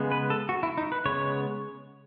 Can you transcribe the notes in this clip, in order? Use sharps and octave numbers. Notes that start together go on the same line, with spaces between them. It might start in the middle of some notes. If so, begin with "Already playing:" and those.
Already playing: C#3 G#3 B3
B4
A4
F#4
E4
D#4
B4
C#3 G#3 B3 C#5